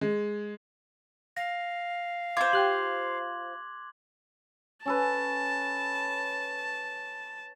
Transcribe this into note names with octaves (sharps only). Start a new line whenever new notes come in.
G#3
F5 A#6
F4 C5 C6 D6 G#6
G4 G5 F#6 F#7
C#4 A4 B4 A5